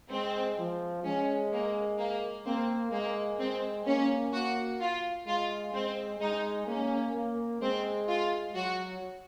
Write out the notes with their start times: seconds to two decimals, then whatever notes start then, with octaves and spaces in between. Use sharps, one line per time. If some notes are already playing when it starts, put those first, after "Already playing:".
0.11 G#3 C4
0.58 F3
1.04 G#3 C#4
1.52 A#3
1.98 A#3
2.46 A#3 C4
2.92 G#3 A#3
3.39 G#3 C4
3.86 A#3 C#4
4.33 A#3 F#4
4.80 F4
5.27 G#3 F4
5.74 G#3 C4
6.20 G#3 D#4
6.67 A#3 C#4
7.15 A#3
7.62 G#3 C4
8.09 F4
8.55 F#3 F#4